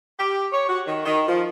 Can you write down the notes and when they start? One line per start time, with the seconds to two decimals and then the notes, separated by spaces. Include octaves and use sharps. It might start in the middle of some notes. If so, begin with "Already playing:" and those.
0.19 G4
0.52 C#5
0.69 F#4
0.87 D#3
1.06 D#3
1.28 F3